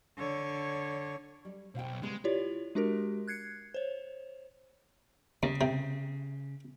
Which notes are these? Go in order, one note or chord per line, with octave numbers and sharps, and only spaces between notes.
D3 C#5
G3 D5
B1 C5 F5 G5
C#3 G3 G#3 B3
E4 F4 G4 C#5 D5
G#3 D4 F#4 G4 A#4
F#6 G#6 C7 C#7
C5 C#5
D#2 C#3
C3